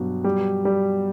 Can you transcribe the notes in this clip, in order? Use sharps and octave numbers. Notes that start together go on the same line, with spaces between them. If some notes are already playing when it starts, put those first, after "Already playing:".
Already playing: G2 B2 F#3
G3
G3